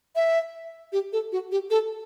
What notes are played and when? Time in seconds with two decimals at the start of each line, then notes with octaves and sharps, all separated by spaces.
0.16 E5
0.92 G4
1.13 A4
1.32 F#4
1.52 G4
1.70 A4